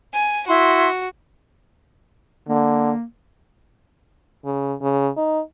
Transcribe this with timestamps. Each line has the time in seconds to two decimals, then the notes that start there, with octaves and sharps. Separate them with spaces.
0.14 G#5
0.47 E4 F#4 C6
2.49 D3 A#3
4.45 C#3
4.81 C#3
5.17 D#4